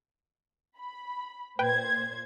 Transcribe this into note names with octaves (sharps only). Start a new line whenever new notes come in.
B5
A#2 B4 C5 G5 G#6